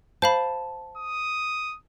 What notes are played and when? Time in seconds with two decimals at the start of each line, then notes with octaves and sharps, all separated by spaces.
0.22 C5 F5 A5 B5
0.97 D#6